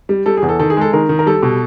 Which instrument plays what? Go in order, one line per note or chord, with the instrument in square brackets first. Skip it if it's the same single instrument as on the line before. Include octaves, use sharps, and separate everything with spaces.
[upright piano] G3
G3 A4
G#4
E2
A4
D#3 A4
G#4
G#3 A4
D#3 A#4
D#3
A#4
G3 A4
B2